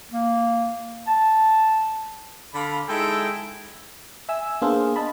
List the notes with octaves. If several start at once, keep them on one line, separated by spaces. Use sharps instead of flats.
A#3
A5
D3 F5 B5
G#3 D#4 E4 A4 G5
E5 G#5 E6
A#3 B3 D4 G#4 C5 F5
D#5 A5 B5